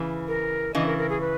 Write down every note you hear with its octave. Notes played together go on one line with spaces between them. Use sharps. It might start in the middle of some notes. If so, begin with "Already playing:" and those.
Already playing: C#3 E3
A#4
C#3 E3 D#5
A#4
A#4
G#4
B4